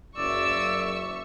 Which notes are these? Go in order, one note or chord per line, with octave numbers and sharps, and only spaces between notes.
F#1 D5 E5 C#6 E6